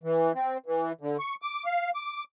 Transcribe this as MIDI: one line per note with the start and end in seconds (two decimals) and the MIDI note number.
0.03 0.32 52
0.35 0.57 60
0.66 0.92 52
1.01 1.17 50
1.19 1.35 85
1.42 1.64 86
1.65 1.90 77
1.95 2.24 86